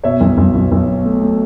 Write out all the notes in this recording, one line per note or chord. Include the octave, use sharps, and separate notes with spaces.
B2 C#5 E5
B1
B1
B1
B1
B2
A3
A3